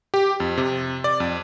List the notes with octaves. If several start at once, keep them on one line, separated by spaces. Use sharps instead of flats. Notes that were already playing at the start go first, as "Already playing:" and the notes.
G4
F2
C3
D5
F2